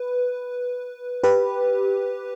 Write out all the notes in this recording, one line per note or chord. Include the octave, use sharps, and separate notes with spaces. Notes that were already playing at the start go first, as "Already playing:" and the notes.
Already playing: B4
G4 B4